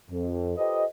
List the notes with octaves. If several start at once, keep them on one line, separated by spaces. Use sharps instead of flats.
F2
F4 G4 A4 B4 C5 D#5